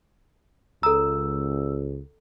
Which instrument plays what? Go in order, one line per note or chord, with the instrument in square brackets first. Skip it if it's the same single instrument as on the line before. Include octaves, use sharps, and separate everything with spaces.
[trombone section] C#2 [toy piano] A4 A#5 [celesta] E6